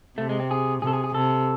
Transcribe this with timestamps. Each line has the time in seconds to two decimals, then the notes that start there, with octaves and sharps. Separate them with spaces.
0.18 C3 A3
0.29 G#3
0.40 C4
0.51 G#4
0.82 C3 G#4 A4
0.93 G#4
1.04 G#4
1.14 C3 A4